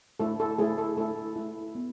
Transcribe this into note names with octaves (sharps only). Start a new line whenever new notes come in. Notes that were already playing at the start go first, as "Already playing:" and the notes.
A3 E4 A4
A4
A3 E4 G#4
A4
A3 E4 A4
A3 E4
B3